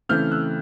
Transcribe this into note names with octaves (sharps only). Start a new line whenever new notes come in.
C#3 E3 A3 C4 F6 G6
E6 F#6